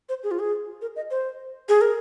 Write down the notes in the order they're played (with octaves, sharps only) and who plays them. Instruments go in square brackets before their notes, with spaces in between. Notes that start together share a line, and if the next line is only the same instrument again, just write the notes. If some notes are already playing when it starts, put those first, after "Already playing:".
[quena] C5
G#4
F4
G#4
A#4
D#5
C5
G#4
A#4